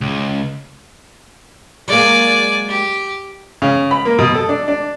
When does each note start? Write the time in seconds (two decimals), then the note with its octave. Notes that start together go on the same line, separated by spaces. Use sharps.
0.01 C#2
1.88 F#3 G#3 A#3 D5 G#5
2.69 G4
3.62 C#3
3.91 B5
4.05 A#3
4.19 B2
4.34 A4
4.49 D4
4.68 D4